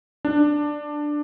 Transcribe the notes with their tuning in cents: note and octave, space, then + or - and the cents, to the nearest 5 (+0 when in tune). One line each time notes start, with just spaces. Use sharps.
D4 +10